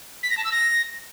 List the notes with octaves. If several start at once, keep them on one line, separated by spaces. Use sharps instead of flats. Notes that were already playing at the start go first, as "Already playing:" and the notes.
B6
A#6
A5
E6
A#6